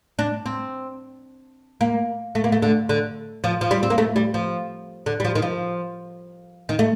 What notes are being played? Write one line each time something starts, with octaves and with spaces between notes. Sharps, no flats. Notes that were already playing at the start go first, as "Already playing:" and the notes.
D4
C4
A#3
A3
A#3
A3
D3
D3
F3
F3
G3
C4
A#3
A3
G3
F3
D3
G3
F3
D#3
F3
D#3
A3